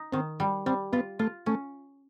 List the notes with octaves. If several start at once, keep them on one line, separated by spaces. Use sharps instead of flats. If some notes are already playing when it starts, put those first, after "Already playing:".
Already playing: D#4
D#3 C4
G3
G3 C4
B3 F4
A3 F4
A3 C#4